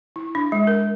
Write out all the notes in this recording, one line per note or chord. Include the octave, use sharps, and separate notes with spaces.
E4
D4
G#3
A#4